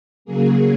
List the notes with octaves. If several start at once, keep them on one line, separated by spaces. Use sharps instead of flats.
C#3 F#3 A#3 G#4